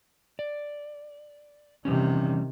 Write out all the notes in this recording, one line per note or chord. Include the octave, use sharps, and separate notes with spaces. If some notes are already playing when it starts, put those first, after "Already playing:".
D5
C3 D#3 E3 G3 C#4